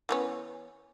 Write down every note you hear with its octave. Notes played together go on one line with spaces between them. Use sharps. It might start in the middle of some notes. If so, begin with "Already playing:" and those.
E3 B3 C#4